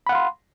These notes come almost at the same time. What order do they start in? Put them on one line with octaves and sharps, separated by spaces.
B5 F#5 F5 C6